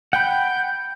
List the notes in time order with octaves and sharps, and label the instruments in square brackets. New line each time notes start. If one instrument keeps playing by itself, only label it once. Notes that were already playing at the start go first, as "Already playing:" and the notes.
[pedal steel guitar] F#5 G5 B5 [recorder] G6